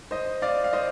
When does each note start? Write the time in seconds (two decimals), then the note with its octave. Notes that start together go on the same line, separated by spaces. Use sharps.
0.11 C5 D#5
0.42 D5 F5
0.64 F5
0.73 C5 D#5